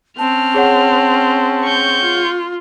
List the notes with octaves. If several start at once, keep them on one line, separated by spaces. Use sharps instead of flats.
C4 C#4 A5 F6
G#4 C#5 F#5
C#6 G6
F4